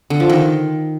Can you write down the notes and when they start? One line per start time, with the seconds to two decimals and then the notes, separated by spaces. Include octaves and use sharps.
0.10 D3
0.20 F3
0.29 D#3